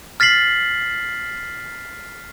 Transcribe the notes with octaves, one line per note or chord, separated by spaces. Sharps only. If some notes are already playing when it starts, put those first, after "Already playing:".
F6 A6 B6 C7 F#7